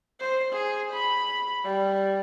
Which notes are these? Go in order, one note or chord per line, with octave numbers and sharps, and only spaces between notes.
C5
G#4
B5
G3